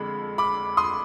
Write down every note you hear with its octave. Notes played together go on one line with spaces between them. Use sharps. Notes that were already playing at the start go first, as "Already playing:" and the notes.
Already playing: F2 D3 G#3 B5
B5 D6
C6 D#6